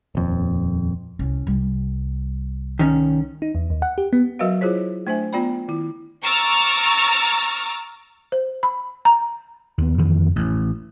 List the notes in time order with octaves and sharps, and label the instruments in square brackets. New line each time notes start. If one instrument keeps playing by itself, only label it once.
[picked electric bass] D#1 F2
[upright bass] C2 C#4
C2 G3
[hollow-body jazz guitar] D#3 C#4
[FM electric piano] D#4
E2
D#2
F#5
G4
B3
[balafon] F#3 F#4 A#4 B4 D#5 F5
E4 F4 G#4 C5 C#5
A3 D4 C5 E5 G#5
B3 F4 D5 G5 B5
D#3 E4
[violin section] A#5 C#6 D6 E6 F6 A6
[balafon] C5
B5
A#5
[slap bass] D#2 B3
F2 D#3 E3
A1